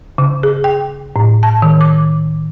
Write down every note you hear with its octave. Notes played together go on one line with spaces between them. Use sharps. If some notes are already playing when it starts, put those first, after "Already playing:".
C#3
G#4
G5
A2
A5
D#3
D6